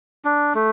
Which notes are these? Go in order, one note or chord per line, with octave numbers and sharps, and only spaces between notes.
D4
A3